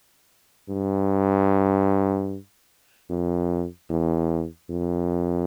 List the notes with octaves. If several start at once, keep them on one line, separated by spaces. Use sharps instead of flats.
G2
F2
E2
F2